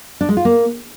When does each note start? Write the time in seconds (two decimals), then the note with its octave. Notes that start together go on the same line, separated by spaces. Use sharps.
0.21 D4
0.29 G#3
0.37 F4
0.45 A#3